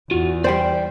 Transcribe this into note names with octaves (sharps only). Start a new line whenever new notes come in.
E2 F4 F#4
G3 C5 D5 G5